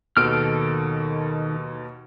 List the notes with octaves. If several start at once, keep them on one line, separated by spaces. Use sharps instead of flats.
D#2 B2 D#3 A4 F6 D7